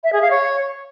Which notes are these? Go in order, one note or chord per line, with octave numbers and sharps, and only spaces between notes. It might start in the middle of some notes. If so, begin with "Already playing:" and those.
E5
G#4
F5
C#5